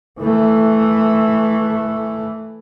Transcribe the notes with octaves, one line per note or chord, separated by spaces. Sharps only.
E3 A3